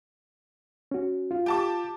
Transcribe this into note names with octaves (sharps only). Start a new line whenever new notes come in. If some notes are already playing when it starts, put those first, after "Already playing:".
C#4 F#4
F4
G4 A5 D6